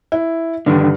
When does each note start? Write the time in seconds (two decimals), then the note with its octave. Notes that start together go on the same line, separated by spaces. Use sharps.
0.12 E4
0.66 G2 D3 D#3